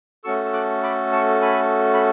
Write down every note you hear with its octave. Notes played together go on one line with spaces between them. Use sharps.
A3 C#4 F#4 A4 C#6 E6
E6
D6 F#6
B5 D6
A5 C#6
G#5 B5
B5